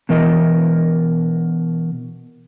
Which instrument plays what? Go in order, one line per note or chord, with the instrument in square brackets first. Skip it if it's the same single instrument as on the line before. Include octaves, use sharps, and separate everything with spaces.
[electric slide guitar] B2 E3 A#4 D#5